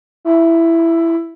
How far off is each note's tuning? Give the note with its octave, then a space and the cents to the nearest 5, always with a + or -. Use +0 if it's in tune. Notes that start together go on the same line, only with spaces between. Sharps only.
E4 +10